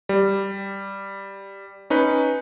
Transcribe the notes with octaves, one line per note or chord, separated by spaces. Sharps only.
G3
C#4 D#4 B4